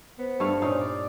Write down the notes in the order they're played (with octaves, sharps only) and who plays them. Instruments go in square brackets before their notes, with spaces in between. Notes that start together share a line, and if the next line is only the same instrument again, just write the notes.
[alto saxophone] B3 [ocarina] C5
[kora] G2 A3 F5
[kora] A#2 D#4 F5 [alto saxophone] C#4
[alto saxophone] D5